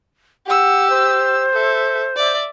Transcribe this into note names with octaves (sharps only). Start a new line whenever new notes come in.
G4 F#5 E6
C5
A4 E5
D5 E5